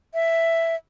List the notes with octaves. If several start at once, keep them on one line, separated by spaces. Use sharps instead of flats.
E5